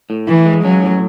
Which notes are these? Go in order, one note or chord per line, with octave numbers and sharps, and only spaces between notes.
A2
E3 E4
G#3
F#3 C#4
A2